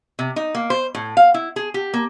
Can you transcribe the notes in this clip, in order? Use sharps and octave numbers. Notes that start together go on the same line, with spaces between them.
C3
D#4
A#3
C5
A2
F5
E4
G#4
G4
A#3